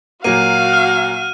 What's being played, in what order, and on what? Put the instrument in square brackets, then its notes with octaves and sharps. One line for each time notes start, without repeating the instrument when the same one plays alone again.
[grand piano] A#2 F#3 A#3 [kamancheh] F#4 F5 [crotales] D#7
[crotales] F6